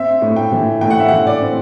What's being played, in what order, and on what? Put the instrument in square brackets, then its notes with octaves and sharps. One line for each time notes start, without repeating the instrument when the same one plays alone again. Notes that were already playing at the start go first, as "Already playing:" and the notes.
Already playing: [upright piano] C4 E5
A2
G5
E3
A2 G5
F#5
E5
E3 F#5
D5
C4